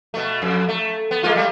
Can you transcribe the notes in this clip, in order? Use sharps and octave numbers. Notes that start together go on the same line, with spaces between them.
B2 A3
F2
A3
B3
G#3 A#3 F4
G3 A3